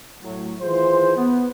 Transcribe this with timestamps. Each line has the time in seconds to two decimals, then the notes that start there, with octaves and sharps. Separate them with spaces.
0.23 A2 F#3
0.62 D#3 E3 F4 G#4 C5
1.17 B3